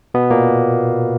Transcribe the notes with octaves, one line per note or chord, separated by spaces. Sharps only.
B2 B3
A#2 A#3